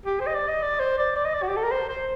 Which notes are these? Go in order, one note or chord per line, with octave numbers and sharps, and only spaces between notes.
G4
C5
D#5
D5
D#5
D5
C5
D5
D5
D#5
D5
F#4
G4
A4
A#4
C5
C5